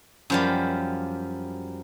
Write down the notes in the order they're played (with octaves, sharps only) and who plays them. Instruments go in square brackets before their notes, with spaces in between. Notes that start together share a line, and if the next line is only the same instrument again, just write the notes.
[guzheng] F#2 F3 G3